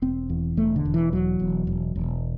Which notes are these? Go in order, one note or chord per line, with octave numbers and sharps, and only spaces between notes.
E1 C4
E2
E1 A3
D3
E1
E3
E2 F#3
E1
E1
E1